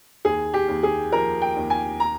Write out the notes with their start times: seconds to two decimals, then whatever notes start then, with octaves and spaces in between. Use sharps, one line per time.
0.25 D#2 G#4
0.54 G4
0.68 D#2
0.83 G#4
1.12 F3 A#4
1.42 G5
1.56 D#2
1.70 G#5
2.00 A#5